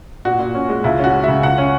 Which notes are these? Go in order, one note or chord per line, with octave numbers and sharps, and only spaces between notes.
A#2 F#4
A#2
C#4
G#3
C#2 E4
C#4 F#4
G#3
C#3 E5
C#2 F#5
C#4